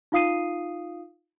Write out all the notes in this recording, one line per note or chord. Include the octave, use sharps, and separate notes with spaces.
D#4 F4 F5 D#6 C7 D#7